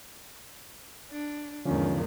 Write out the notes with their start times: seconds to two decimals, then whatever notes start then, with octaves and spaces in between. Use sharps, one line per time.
1.10 D4
1.65 E2 G#2 D3 D#3 F3 C#4